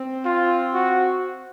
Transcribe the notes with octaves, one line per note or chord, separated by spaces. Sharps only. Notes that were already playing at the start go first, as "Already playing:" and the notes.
Already playing: C4
F4
F#4